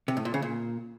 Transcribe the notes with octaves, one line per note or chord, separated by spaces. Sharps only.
C3
A2
A#2
C#3
A#2